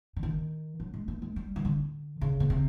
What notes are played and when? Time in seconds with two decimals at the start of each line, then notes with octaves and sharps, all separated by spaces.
0.16 D3
0.23 D#3
0.80 F#3
0.94 G#3
1.08 A3
1.22 G#3
1.36 G3
1.56 D#3
1.65 D3
2.21 C#3
2.40 B2
2.50 C3